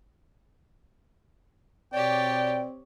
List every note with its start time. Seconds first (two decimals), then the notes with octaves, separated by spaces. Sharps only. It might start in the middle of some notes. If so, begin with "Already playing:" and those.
1.93 B2 C4 G4 C#5 D5 G5